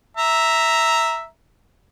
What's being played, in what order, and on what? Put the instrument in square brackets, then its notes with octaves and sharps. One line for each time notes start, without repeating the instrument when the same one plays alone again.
[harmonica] E5 A#5